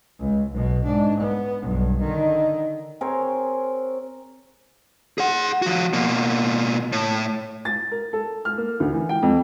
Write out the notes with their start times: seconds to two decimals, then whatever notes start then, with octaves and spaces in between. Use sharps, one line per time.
0.20 C#2
0.51 B1 B2
0.85 G#2 D4
1.20 B3
1.62 B1 G2
2.01 D3 D#3
3.01 C4 G#4 A#4 C#5
5.18 G#4 F#5
5.62 F3 F#4
5.93 B2 A#3
6.92 A2
7.65 A6
7.91 A#4
8.13 A4
8.45 F6
8.58 A#3
8.80 D2
8.93 E3
9.09 G5
9.22 F2